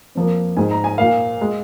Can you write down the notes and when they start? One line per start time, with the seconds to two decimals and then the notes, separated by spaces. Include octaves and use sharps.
0.15 F2 F3 A#3
0.57 G#2 G#3 G#5
0.71 A#5
0.84 G#5
0.98 A#2 A#3 F5
1.41 G#3